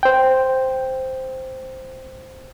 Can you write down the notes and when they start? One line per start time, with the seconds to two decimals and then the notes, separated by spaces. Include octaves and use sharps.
0.03 C5 G5